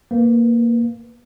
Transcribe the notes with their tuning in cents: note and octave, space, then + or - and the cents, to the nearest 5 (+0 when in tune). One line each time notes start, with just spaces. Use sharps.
A#3 +0 B4 +0